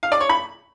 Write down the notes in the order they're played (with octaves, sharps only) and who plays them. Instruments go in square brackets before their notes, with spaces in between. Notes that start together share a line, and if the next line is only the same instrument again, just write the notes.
[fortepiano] F5
D5
C#5
B5